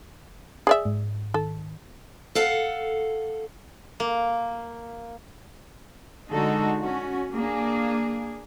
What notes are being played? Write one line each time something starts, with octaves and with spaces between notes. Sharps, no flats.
G#4 D5 E5
G#2
D#3 A4
A4 F5 F#5
A#3
D3 G#3 D#4 F#4 A4
C#4 F#4
A#3 D4 G#4